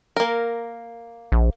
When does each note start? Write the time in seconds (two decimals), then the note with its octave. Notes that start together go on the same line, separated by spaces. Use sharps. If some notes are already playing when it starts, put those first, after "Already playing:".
0.16 A#3 A#4
1.32 A#1